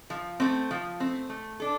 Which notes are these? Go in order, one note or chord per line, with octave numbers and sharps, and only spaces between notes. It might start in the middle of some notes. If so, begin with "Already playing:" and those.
F3
A3 C4
F3
A3 C4
A3
D4 A4